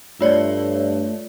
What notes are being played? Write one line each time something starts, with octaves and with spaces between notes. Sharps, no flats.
G2 A3 F4 C#5 D5